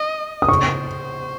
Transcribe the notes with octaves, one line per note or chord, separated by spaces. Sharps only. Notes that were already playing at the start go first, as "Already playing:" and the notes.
Already playing: D#5
D#6
C5 C#6